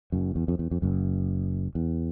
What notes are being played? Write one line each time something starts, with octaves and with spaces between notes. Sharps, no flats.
F#1 F#2
E2
F2
E2
F2
F#1 F#2
E2